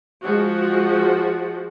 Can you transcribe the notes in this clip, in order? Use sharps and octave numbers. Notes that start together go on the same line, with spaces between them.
F3 G#3 F#4